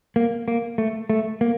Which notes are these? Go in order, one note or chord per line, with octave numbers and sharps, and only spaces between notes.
A#3
A#3
A3
A3
A#3